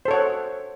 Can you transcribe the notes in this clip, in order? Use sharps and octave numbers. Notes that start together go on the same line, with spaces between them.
A4 C5 C#5 F#5